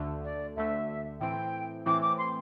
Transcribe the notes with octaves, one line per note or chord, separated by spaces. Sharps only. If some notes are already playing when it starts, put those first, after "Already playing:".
Already playing: D2 D3 A3
D5
D2 D3 A3 E5
A2 E3 C4 G5
A2 E3 C4 D6
D6
C6